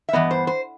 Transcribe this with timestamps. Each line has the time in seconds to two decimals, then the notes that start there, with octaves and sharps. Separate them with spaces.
0.09 E5
0.13 G2 E3 B3 D#5
0.31 C5
0.47 C5